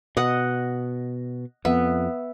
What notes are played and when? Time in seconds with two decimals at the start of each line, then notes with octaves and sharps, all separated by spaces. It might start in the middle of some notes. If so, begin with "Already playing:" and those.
0.17 B2 D#5 F#5
1.65 F2 B3 E5